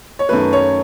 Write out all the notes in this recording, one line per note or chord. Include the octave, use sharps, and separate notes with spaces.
C#5
F#2 D#3 A3 B4
C#5